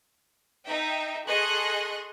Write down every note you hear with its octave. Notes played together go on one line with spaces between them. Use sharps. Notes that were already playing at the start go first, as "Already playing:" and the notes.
D#4 E5 G5
G#4 A4 D#5 C6 C#6 F#6